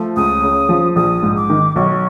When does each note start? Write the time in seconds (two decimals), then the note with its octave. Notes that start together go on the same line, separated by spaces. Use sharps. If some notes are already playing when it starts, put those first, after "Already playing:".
Already playing: F3 A3
0.17 C#2 D#6
0.42 C#3
0.69 F3
0.96 A#1 D#6
1.22 G#2
1.36 D6
1.50 D#3
1.76 B1 C#6